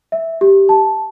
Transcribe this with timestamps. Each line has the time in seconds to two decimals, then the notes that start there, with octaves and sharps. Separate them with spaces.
0.12 E5
0.41 G4
0.69 A5